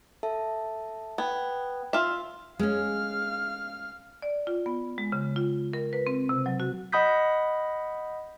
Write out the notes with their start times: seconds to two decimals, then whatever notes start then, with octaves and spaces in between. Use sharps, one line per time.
0.23 A4 E5 A5
1.18 B3 G5 G#6
1.93 F4 E5
2.59 G#3 C#4 F5 F6
4.22 D5
4.47 F4
4.66 B3
4.98 G#3
5.12 C#3
5.36 F4
5.73 A#4
5.93 B4
6.07 C4
6.29 C3
6.46 F#3
6.60 F#4
6.92 D#5 F#5 B5 D#6 G6 B6